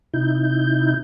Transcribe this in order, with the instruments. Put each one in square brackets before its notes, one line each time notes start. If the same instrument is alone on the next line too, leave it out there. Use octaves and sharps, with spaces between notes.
[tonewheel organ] C3 D#4 E4 G6